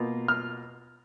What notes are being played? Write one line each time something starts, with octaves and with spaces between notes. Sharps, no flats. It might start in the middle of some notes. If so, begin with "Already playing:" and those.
Already playing: B2 A#3 F4
F6